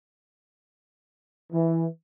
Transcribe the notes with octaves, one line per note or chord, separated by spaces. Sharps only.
E3